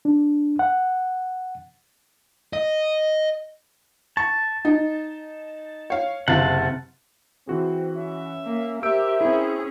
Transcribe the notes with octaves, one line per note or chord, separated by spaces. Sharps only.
D4
F#5
D#5
A5 C#6
D#4
C#5 F5
F#1 C3 F5 F#5 A5
E3 C4 F#4 G#4
C#4 E5
A#3
G4 A#4 C5 E5 E6 G6 D7
C4 C#4 E4 G#4